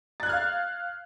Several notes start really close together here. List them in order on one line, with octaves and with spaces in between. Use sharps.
A6 F#6 G#6 F6 F5